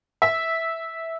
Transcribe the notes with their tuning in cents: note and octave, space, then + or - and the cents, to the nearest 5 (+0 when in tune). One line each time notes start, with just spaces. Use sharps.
E5 -10